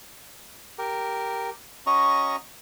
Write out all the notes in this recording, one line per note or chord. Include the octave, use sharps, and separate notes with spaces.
G4 A#4
C#4 F#4 D#5 A#5 C#6